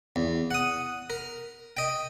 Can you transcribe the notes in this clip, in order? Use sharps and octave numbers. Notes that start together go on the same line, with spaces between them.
E2
F#5 D#6
A#4
D#5 G5